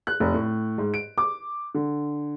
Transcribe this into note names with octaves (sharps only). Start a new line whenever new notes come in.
F#6
F1
A2
G#2
D7
D6
D3